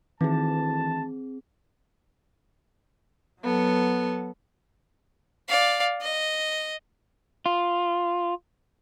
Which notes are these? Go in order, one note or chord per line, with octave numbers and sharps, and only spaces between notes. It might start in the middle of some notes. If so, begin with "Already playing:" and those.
D2 D#3 E3 C4 G#4 A5
F#3 B3 A4
D5 F5
D#5
F4